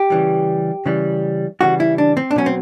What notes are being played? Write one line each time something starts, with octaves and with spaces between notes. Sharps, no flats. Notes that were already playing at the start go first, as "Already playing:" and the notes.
Already playing: G4
C#3 E3 G3
C#3 E3 G3
C#3 E3 G3 F#4
E4
D4
C4
D4
B2 F#3 C#4
C4